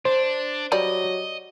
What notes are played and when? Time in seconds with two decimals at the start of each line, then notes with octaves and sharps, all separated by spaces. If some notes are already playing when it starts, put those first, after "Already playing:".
0.05 D4 C5
0.72 F#3 G3 D5 D#5